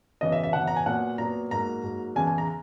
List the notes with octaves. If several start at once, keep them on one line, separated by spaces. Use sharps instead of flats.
F#2 C#3 E3 B3 D#5
E5
E5
F#2 C#3 E3 B3 F#5
A#5
G#5
A#2 F#3 B3 F#5
A#2 F#3 B3 A#5
G#2 F#3 A#3 A#5
G#2 F#3 A#3
E2 C#3 E3 G#5
G#5
A#5